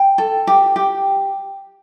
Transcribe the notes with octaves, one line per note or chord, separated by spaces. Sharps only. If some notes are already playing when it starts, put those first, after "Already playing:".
Already playing: G5
A4
G4
G4